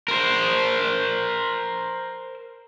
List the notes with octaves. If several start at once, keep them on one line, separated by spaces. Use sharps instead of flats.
A#4 C5